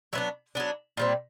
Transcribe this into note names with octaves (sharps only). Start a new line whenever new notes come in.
F#3 B3 D4 E5
F#3 B3 D4
A#2 G3 C4